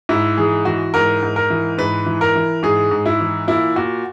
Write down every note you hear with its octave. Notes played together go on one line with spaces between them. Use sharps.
G#2 E4
E3 G#4
E3 F#4
G#2 A#4
G#2
A#4
E3
G#2 B4
E3
A#4
E3
G#2 G#4
G#2
E4
E3
A#2 E4
A#2 F#4